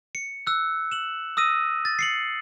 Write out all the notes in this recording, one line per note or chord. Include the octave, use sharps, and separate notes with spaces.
C#7
E6 F#6
E7 F#7
D#6 E6 A#6 D#7
A6
C7 C#7 F#7